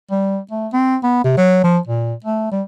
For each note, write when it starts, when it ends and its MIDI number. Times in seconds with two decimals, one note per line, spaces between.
0.11 0.40 55
0.51 0.67 57
0.73 0.97 60
1.03 1.24 59
1.24 1.35 48
1.37 1.61 54
1.64 1.78 53
1.87 2.14 46
2.24 2.49 57
2.52 2.63 55